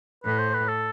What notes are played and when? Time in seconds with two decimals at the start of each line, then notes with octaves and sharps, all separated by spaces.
0.24 A2 B4
0.38 C5
0.54 B4
0.68 A4